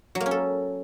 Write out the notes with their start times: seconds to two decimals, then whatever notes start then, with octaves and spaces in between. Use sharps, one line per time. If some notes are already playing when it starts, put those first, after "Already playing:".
0.15 F#3
0.20 A#3
0.26 C#4
0.31 A4